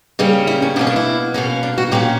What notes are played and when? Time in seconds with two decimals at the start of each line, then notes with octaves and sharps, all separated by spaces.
0.19 C#3 G3 A#3 C#4
0.47 E4
0.62 C#4
0.76 B2 D4
0.79 A#3 C#4
0.87 D4
0.96 E4
1.34 B2 A#3 C#4
1.63 D4
1.78 F#4
1.91 A#2 A#3 C#4 G4